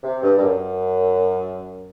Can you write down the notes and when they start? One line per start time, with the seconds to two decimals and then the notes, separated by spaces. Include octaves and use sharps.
0.03 C3
0.23 G2
0.38 G2
0.43 F#2